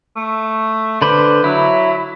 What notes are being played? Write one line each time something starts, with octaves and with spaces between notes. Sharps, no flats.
A3
D3 B4 C5 D5
F#3 E4